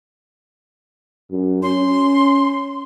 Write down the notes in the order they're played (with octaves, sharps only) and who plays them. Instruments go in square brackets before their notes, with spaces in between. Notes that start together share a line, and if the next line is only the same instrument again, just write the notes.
[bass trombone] F#2
[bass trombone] C#4 [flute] C6